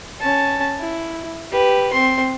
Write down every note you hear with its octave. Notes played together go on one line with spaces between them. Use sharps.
C#4 A5
E4
G4 B4
C4 C6